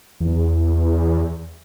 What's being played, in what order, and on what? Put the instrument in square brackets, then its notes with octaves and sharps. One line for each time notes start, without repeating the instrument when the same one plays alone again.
[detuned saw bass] E2